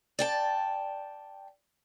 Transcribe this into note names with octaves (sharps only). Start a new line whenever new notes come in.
D5 G5 A5